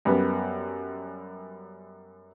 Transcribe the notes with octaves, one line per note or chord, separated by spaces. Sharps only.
F#2 G3 B3